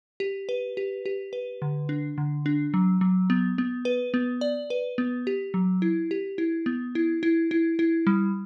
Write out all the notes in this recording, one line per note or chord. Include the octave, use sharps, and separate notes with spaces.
G4
B4
G4
G4
B4
D3
D4
D3
D4
F#3
F#3
B3
B3
B4
B3
D5
B4
B3
G4
F#3
E4
G4
E4
B3
E4
E4
E4
E4
G3